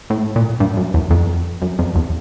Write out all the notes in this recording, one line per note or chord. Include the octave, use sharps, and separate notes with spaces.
A2
A#2
G2
F#2
E2
F2
F#2
F2
E2